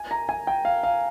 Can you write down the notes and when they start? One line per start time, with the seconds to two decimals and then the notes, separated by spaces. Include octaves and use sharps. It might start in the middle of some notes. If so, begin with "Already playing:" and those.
Already playing: G#5
0.11 A#5
0.29 G#5
0.47 G5
0.65 F5
0.83 F5